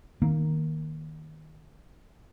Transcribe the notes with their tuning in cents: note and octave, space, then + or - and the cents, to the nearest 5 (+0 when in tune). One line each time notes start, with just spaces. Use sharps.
D#3 +0 A#3 +0